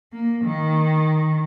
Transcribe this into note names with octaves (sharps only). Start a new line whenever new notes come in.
A#3
D#3